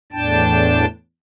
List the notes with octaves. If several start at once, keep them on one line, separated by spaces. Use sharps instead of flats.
E2 A2 D4 G5 A5